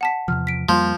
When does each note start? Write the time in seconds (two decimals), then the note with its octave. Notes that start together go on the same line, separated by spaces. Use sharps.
0.01 F#5 A5 B6
0.28 E2 C3 F3 F6
0.47 B6 D7
0.69 F2 F3 G3 A#3 C6